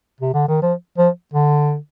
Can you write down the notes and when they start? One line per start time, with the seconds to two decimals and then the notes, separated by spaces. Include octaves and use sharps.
0.21 C3
0.34 D3
0.48 D#3
0.62 F3
0.98 F3
1.33 D3